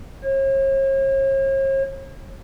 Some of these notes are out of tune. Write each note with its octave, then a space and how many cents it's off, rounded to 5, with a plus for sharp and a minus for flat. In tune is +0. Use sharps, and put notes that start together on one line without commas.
C#5 -45